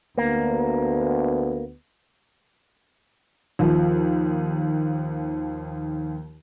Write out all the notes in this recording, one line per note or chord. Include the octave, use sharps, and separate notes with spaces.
D2 A#3 B3
D#2 F3